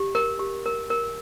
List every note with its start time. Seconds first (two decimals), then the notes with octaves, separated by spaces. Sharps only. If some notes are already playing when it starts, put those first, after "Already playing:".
Already playing: G4
0.15 A#4
0.39 G4
0.66 A#4
0.90 A#4